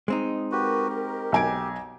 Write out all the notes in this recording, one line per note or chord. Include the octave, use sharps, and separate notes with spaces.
G#3 C4 D#4
F#4 G4 A#4 B4
G4
B1 G#5 D7